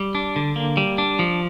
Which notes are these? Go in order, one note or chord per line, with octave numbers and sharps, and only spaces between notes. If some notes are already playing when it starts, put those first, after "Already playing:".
Already playing: G3
D4
D3
A#3
G3
D4
F3